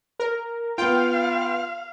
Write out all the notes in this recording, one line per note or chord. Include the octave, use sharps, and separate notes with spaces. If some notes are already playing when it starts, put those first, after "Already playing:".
A#4
B3 F4 F5 G5